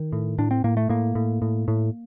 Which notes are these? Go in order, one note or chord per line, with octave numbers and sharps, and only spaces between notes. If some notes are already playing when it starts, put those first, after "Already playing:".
Already playing: D#3
A2
A2 D4
C4
A2 A#3
A3
A2 A#3
A2
A2
A2